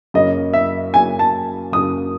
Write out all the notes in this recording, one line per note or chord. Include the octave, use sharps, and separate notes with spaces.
F#2 C#3 F#3 A#3 D#5
E5
F#2 C#3 F#3 A#3 G#5
A5
F#2 C#3 F#3 A#3 D#6